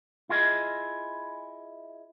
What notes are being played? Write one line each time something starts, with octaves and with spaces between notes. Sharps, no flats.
E4 F4 G#4 D#5